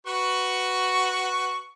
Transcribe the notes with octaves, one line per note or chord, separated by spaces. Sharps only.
F#4 B4 C#6